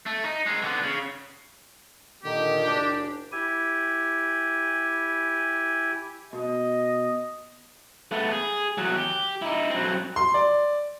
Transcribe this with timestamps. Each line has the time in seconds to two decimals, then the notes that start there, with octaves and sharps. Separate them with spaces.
0.06 A3
0.24 D#4
0.46 G#3 C4
0.63 D3 B3
0.83 C#3
2.23 A#2 D3 D#3 G4
2.66 F#1 D4
3.32 E4 G4 G#5
6.33 B2 D#5
8.12 A3 B3
8.31 G#4
8.78 E2 F#3
8.96 G4
9.42 D#4 E4
9.70 F#3 C4
10.16 C6
10.34 D5